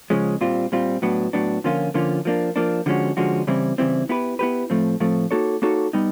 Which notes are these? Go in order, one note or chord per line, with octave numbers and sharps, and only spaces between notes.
C#3 F3 G#3 C#4
A#2 G3 C4 F4
A#2 G3 C4 F4
A2 F#3 B3 D4
A2 F#3 B3 D4
D3 F3 A#3 C#4 F4
D3 F3 A#3 C#4 F4
F3 A#3 D4
F3 A#3 D4
D3 F3 G#3 C#4 F#4
D3 F3 G#3 C#4 F#4
C#3 E3 G3 C4 E4
C#3 E3 G3 C4 E4
B3 E4 G4 B4
B3 E4 G4 B4
A2 F3 A3 C4
A2 F3 A3 C4
A#3 D#4 F#4 A4 C#5
A#3 D#4 F#4 A4 C#5
G3 B3 D#4